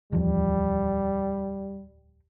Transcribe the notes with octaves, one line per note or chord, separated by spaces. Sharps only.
D1 E2 F3 G3